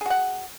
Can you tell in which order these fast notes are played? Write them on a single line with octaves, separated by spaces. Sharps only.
G#4 F#4 F#5